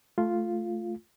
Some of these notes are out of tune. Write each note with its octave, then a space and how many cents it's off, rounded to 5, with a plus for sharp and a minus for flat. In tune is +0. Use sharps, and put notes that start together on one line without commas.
A3 -10 F4 +0